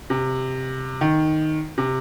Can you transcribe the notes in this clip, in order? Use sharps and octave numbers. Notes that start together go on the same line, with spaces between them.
C3
D#3
C3